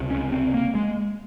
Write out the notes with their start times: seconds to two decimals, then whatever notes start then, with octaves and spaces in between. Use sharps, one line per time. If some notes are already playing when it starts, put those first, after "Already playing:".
Already playing: C#2 C3
0.10 C#4
0.32 C4
0.54 A#3
0.75 G#3